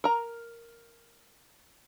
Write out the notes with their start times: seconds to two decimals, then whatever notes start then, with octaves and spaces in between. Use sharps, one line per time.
0.04 A#4 A#5